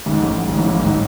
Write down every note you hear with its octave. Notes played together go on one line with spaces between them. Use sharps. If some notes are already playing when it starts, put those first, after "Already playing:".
G#1 G#2
A1 A2
G#1 G#2
A1 A2
A1 A2
G#1 G#2